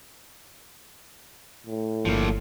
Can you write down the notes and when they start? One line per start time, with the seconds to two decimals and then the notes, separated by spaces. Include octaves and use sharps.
1.66 A2
2.05 G1 F3 A#3